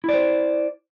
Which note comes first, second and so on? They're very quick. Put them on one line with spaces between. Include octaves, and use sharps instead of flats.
E4 D5 C5